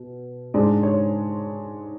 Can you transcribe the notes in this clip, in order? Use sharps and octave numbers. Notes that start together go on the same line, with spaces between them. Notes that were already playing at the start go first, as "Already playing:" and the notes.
Already playing: B2
G#2 G#3 D4 D5
C#5